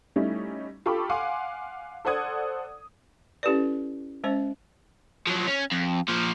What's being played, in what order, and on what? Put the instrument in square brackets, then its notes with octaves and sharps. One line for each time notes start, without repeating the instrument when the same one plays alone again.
[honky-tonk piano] G3 A3 C#4 D#4 E4
F4 G4 A4 B5 C#6 D6
F5 F#5 G#5 C6 D6
A4 C5 D5 F#5 D#6 G#6
[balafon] C#4 E4 G4 A4 B4 D5
G#3 C#4 C5 D#5
[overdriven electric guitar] F3 F#3
C#4
F2
A#2 F3